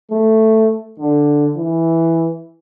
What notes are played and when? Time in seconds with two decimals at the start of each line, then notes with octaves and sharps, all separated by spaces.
0.11 A3
1.00 D3
1.57 E3